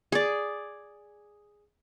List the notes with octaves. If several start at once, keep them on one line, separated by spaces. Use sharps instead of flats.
G#4 D5